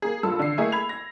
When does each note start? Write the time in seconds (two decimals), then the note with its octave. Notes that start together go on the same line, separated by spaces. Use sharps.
0.02 A#3 G#4
0.23 G2 F4 A4 E6
0.39 D3 C7
0.58 A3 A#3 E4 G#4 D#5 G#5
0.72 B5 G#6 F7
0.89 A#6